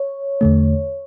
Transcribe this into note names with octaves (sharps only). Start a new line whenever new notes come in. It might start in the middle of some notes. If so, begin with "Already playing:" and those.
Already playing: C#5
E2 D3 A3